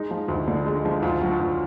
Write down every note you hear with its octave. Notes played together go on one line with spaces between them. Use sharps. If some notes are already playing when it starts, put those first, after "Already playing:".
Already playing: G#3 D#4
F3
D2
D3
G#3
F3
D2 F4
F#3
D2